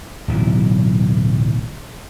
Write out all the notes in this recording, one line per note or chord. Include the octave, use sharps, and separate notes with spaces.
D1 B1 E3